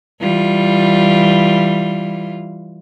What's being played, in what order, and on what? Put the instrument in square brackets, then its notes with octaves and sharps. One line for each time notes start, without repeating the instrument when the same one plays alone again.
[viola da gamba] E3 G3 F4